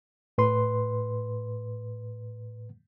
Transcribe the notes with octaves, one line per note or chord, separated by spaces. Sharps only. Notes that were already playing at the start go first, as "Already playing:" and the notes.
A2 B4 C6